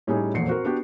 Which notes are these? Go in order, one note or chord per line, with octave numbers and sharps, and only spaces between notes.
A2 G3 C#4 D#4 G#4
E1 F2 A#2 C7 C#7
C4 F#4 A#4
B3 D4 F#4 G4